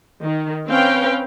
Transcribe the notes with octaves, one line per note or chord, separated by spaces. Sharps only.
D#3
C4 C#4 B4 F5 G5